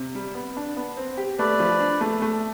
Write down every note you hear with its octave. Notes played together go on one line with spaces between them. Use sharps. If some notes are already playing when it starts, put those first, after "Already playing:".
Already playing: C3
G3
B3
D4
B3
C4
G4
A3 B4 D5
F3
D4
A3
A3